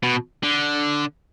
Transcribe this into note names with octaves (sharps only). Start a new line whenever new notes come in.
B2
D3